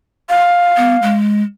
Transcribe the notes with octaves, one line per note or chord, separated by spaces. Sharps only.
F5
B3
G#3